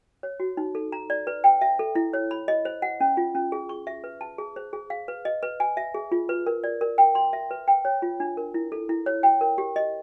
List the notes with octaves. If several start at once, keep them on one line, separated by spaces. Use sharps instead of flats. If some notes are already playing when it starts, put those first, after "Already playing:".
C#5
F#4
D#4
A4
A#5
D5
B4
G5
E5
A4
E4
C#5
B5
D#5
C5
F#5
C#4
F4
C#4
G#4
C#6
E5
B4
A5
G#4
C5
G#4
F5
B4
D#5
B4
G#5
E5
G#4
F4
B4
A#4
D5
A#4
G5
C6
E5
B4
G5
C#5
F4
D4
A#4
E4
A4
E4
C#5
G5
A#4
G4
D#5